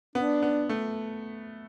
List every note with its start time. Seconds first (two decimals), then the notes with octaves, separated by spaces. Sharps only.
0.15 B3 D4
0.42 B3
0.69 A3